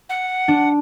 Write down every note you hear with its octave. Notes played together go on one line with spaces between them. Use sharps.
F#5
D4